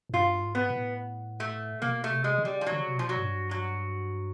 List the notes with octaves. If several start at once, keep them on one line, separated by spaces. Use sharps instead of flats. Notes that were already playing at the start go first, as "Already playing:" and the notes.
G#2
G2 F4
G#2
B3
A2
A3
B2 A#3
A3
C3
G#3
C#3
G3
F3
F#3
D3
C#3
C3
B2 F3
F#3
G#2
G2
F#3